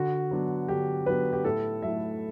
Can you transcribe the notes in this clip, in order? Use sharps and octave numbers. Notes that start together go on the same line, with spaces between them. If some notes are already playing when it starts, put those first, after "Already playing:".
Already playing: D3 F#4
F#3 B3 D4
D3 G4
F#3 B3 D4 B4
G4
A2 A4
F#3 A3 E4 E5